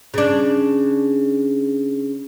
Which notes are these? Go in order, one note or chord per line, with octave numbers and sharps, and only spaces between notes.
C#3 D4